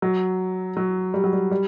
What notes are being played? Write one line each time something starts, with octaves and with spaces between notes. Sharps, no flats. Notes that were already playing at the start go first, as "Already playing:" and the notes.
F#3
F#3
G3
F#3
G3
G3